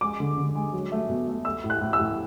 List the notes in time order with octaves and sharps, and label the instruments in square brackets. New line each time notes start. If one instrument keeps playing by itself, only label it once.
[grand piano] G#3 D6
D3
D3
G#3
F#3
A3
B2
A3
A3 E6
A2
F#6
A2
E6
A2